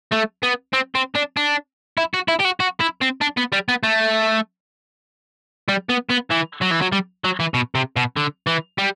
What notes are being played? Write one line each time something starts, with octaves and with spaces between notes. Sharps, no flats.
A3
B3
C4
C4
D4
D4
E4
F#4
E4
G4
F#4
F#4
E4
C4
D4
B3
G3
B3
A3
G3
B3
B3
E3
F#3
E3
F#3
G3
F#3
E3
B2
C3
B2
D3
E3
G3